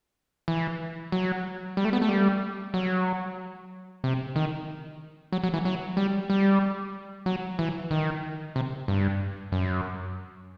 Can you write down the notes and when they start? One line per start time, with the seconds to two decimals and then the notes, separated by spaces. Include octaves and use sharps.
0.48 E3
1.12 F#3
1.77 G3
1.85 A3
1.93 B3
2.02 A3
2.09 G3
2.74 F#3
4.04 C3
4.36 D#3
5.32 F#3
5.44 F#3
5.54 E3
5.65 F#3
5.97 G3
6.30 G3
7.26 F#3
7.59 E3
7.91 D#3
8.56 C3
8.88 G2
9.52 F#2